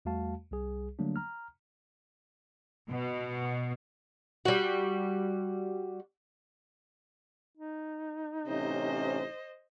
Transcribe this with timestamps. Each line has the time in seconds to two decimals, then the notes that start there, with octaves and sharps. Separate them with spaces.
0.05 E2 G3 A3 F#4 F5 A5
0.51 C2 G3 G#4
0.99 D3 F#3 G3 A3 A#3 D4
1.16 A#5 F6
2.89 B2
4.45 G3 F#4
7.57 D#4
8.47 A1 C3 C#4 C5 D#5